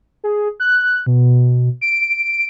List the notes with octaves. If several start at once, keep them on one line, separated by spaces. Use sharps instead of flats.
G#4
F#6
B2
D7